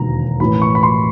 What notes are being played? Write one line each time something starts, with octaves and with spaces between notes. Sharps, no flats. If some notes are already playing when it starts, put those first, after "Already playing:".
Already playing: E1 D#2 D3 A#5
A1 A2 E3 B5
C#6
B5
C6